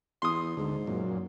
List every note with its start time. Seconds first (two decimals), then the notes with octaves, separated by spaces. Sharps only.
0.22 E2 C6 D#6
0.57 D2 G#2
0.87 F#2 A#2